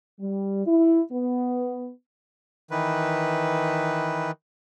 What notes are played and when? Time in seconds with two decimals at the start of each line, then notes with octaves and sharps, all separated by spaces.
0.19 G3
0.66 E4
1.11 B3
2.71 D#3 E3 B4